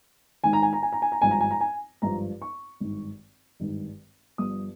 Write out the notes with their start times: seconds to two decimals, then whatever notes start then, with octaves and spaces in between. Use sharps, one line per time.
0.44 G#1 G#2 D#3 G#5
0.53 A#5
0.62 G#5
0.73 A#5
0.83 G#5
0.93 A#5
1.02 G#5
1.12 A#5
1.22 G#1 G2 F3 G#5
1.31 A#5
1.41 G#5
1.51 A#5
1.61 G#5
2.02 G#1 G2 F3 A#5
2.42 C#6
2.80 G#1 G2 D#3
3.60 G#1 G2 D#3
4.38 G1 G2 F3 D#6